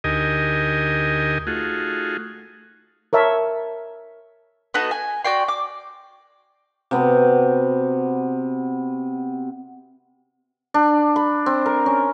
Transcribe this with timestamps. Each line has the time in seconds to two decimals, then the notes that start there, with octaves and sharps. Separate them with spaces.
0.04 D2 D#4 G4 A#4 D#5 G#5
1.47 A3 D#4 F4 F#4 G#4
3.13 A#4 C#5 E5 A5
4.74 B3 D#4 F#4 A4
4.91 G#5
5.24 F#4 D5 G5 C6
5.48 D6
6.91 C3 B3 C4 F#4
10.74 D4
11.16 B5
11.46 C4
11.66 A#4
11.86 C#4